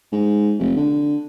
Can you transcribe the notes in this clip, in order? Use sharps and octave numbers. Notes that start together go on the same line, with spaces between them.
G#2
F1
D3